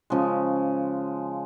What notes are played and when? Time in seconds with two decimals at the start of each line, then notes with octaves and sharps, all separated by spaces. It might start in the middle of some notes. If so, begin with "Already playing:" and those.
0.10 C#3 F3 G#3